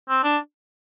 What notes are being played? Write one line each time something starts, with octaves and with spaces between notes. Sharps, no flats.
C4
D4